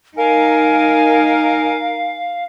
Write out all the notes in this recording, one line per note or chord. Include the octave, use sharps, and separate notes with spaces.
D#4 A#4 F5 G#5